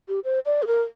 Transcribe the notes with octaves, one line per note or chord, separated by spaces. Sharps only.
G4
C5
D5
G#4
A#4